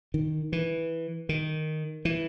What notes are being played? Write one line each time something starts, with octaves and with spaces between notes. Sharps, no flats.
D#3
E3
D#3
E3